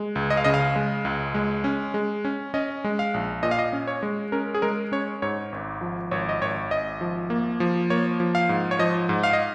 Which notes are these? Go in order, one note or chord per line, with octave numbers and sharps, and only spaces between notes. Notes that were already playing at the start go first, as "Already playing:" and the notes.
Already playing: G#3
C#2
D#5
F5
C#3 D#5
F5
G#3
C#2
G#3
C#4
G#3
C#4
C#4 D#5
G#3
F5
A#1
A#2 D#5
F5
D#5
C#4
C#5
G#3
C#4 A#4
G#4
G#3 A#4
C#4 C#5
G#2 C#5
G#1
F3
G#1 C#5
D#5
G#1 C#5
G#1 D#5
F3
A#3
F3
A#3 C#5
F3
F5
G#2
C#5
F3 D#5
G#2
F5
D#5